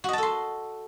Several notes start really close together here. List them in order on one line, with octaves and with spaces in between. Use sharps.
F#4 D#5 A5 A4 C6